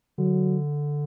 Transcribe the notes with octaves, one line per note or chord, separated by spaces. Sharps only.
D3 F#3